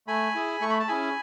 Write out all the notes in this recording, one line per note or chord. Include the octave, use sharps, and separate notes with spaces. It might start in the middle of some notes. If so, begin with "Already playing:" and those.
A3 G#5 B5
E4 G#4
A3 C#6
B5
A5
C#4 E4 G#4 G#5 B5